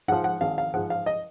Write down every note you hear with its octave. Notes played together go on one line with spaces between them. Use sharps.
G#2 F3 F#5
F#5
G#1 F5
F5
G#2 F3 F#5
F5
D#5